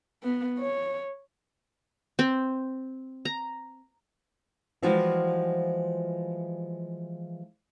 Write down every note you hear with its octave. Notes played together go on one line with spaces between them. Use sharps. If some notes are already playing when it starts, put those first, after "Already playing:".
B3
C#5
C4
A#5
E3 F3 G3 G#3 F4 F#4